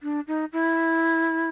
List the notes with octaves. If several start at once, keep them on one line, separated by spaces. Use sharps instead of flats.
D4
D#4
E4